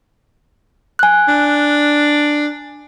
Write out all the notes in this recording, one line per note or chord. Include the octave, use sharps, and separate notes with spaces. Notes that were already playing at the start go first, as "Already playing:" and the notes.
G#5 F#6
D4